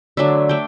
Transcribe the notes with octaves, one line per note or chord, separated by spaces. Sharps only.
D3 F#3 A3 D4 E5
A3 D4 G5